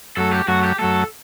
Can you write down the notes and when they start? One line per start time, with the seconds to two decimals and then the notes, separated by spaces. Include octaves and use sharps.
0.17 F#2 F#3 A3 A4
0.32 G4
0.48 F#2 F#3 A3 F#4
0.63 G4
0.79 F#2 F#3 A3 A4